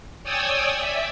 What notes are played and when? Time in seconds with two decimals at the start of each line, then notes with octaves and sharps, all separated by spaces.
0.23 C#5 D5 G5 G#5 D#6 E6
0.74 D5 E5